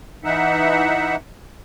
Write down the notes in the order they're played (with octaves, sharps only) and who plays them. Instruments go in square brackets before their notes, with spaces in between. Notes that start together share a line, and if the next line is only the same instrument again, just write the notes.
[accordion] E3 D#4 E5 F#5